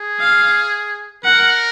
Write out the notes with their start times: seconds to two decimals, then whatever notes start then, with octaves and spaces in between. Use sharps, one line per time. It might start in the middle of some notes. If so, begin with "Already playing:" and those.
Already playing: G#4
0.20 F5
1.24 A#4 F#5